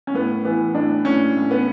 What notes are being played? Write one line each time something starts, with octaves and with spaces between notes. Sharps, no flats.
C#4
A2 B3
E3 B3
A2 D4
A2 C#4
A2
B3